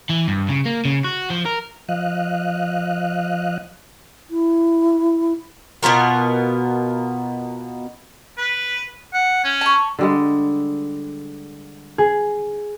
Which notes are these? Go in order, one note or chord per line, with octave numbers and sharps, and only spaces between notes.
E3
G2
C#3
A#3
C#3
F#4
F3
A#4
F3 D#5 F5 F#6
E4
B2 B3 F4 A#4
B4
F#5
C#4
A5 C#6
D3 G3 G#3
G#4